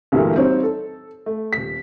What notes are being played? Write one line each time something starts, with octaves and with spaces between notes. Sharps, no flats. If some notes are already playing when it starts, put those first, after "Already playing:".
D2 G2 A#2 E3 A3 A#3
G3 C4 D#4 C5 C#5
A4
A3
D#1 B6